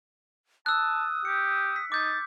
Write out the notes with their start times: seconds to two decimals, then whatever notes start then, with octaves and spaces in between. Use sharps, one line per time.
0.66 A5 D#6 E6 F#6
1.25 G4 C#7
1.76 B6
1.92 D#4 D6 G6 A6